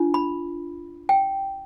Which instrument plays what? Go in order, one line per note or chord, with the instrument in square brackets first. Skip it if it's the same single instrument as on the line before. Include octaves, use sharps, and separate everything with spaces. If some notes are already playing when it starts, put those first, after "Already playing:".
Already playing: [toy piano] D4 F4
B5
G5